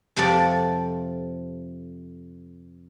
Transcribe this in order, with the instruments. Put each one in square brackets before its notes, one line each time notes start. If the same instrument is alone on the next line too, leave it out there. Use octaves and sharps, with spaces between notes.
[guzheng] F2 C3 F3 G4 A4 D5